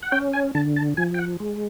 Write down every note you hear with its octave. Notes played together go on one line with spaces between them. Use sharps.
F#5
C#4 G5
G#5
D3 A5
A5
F3 G#5
G5
F#5
G#3